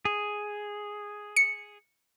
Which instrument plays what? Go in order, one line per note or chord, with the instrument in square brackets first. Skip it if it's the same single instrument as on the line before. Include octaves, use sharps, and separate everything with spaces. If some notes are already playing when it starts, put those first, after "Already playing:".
[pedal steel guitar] G#4
[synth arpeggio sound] C#7